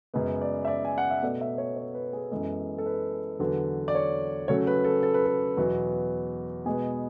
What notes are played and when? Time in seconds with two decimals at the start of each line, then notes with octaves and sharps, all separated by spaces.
0.14 F#2 C#3 G#3 B3
0.42 D5
0.65 E5
0.68 D5
0.85 G#5
0.98 F#5
1.11 E5
1.22 B2 A3 D5
1.41 E5
1.58 C#5
1.77 C#5
1.94 B4
2.13 G#4
2.31 F#2 E3 G#3 B3 A4
2.78 A4
2.86 B4
3.39 E2 D3 F#3 B3
3.88 D5
3.95 C#5
4.48 C#3 F#3 A3 C#5
4.67 B4
4.84 A4
5.03 A4
5.14 B4
5.26 A4
5.57 E2 B2 F#3 B3
6.66 B2 G#3 B3 G#4